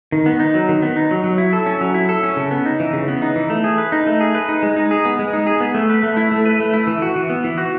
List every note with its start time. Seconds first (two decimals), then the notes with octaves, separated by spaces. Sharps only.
0.12 D#3
0.26 B3
0.40 D#4
0.54 F#3
0.69 D#3
0.82 B3
0.96 D#4
1.11 F#3
1.24 F#3
1.38 E4
1.53 A4
1.66 C#4
1.81 F#3
1.94 E4
2.09 A4
2.23 C#4
2.37 C#3
2.51 B3
2.65 D#4
2.80 E3
2.93 C#3
3.08 B3
3.22 D#4
3.36 E3
3.50 A3
3.64 G#4
3.78 B4
3.92 D#4
4.07 A3
4.21 G#4
4.35 B4
4.49 D#4
4.63 G#3
4.76 D#4
4.91 G#4
5.05 B3
5.19 G#3
5.33 D#4
5.47 G#4
5.60 B3
5.75 A3
5.90 B4
6.03 A3
6.17 E4
6.32 A3
6.46 B4
6.60 A3
6.74 E4
6.87 E3
7.02 F#4
7.16 E3
7.30 B3
7.44 E3
7.58 F#4